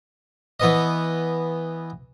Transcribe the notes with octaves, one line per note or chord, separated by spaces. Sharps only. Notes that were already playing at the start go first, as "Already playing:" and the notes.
E3 B3 D#5